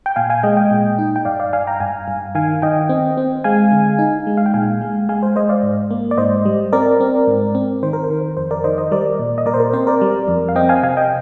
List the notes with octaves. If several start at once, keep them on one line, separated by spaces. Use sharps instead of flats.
G5
A#2 F5 G#5
F5 G#5
G#3 D#5 G5
D#5 G5
A#2
D#4
G5
G2 D5 F5
D5 F5
G2 F5 G#5
G5 A#5
G2 F5 G#5
G2
D#3 F5 G#5
D#3 D#5 G5
C4
C4
G#3 F5 G#5
D3
D#4
G#3
F5
G5
A#2 F5 G#5
G#3
G#3 F5 G#5
C5
G#3 C5 D#5
D5 F5
G#2
A#3
D5
G#2 C5 D#5
G3
C4 A#4 D5
C4
G#2
C4
D#3 C5
A#4
C5
D#3
F2 C5
A#4 D5
D#3 C5 D#5
C5 D#5
G3 A#4 D5
A#2
D#5
A#2 A#4 D5
C5
A#4
C4 C5
A#4 D5
G3
F2
F5
C4 D#5 G5
F5 G#5
C3 F5 G#5
D#5 G5